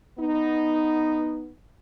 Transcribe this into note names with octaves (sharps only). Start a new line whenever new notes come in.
B3 D#4